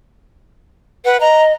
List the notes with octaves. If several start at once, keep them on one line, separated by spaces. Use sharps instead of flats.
B4 F#5
D#5 A#5